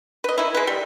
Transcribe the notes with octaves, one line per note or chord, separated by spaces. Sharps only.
B4 D#5
D#3 E4
G#3 B4
G3